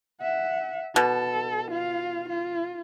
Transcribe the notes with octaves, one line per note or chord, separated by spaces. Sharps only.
E5 F#5
B2 A4
F4 F5
F4